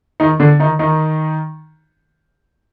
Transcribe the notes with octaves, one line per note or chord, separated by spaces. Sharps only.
D#3 D#4
D3 D4
D#3 D#4
D#3 D#4